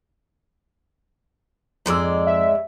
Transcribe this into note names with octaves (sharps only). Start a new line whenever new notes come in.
F2 G#2 G#3 D5 E6
E5